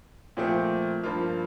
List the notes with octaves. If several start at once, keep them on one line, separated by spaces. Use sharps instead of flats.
A#2 F3 A3 C4
G2 F3 A#3 F4